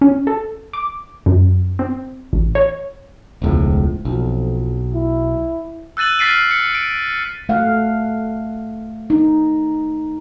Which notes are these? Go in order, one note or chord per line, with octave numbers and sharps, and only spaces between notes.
C#4
A4
D6
F#2
C4
A1
C#5
E1 C#2 A2 F3
B1 F2
E4
E6 F#6 A6 D#7 F#7
F6 A6 B6 C7 D7 D#7
C#7
D7
A3 F5 F#5
D#4